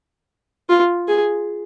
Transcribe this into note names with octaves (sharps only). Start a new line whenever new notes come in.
F4
G#4